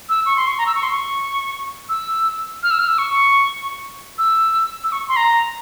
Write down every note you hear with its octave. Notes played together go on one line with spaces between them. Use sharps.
E6
C#6
C6
C#6
A#5
E6
C#6
C6
C#6
E6
F6
E6
F6
E6
C#6
C#6
E6
E6
C#6
C6
A#5